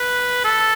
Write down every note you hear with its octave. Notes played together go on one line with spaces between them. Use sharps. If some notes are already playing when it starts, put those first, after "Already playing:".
Already playing: B4
A4